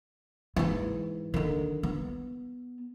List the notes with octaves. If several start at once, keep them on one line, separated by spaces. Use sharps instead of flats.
G#2 E3
D3 D#3
B3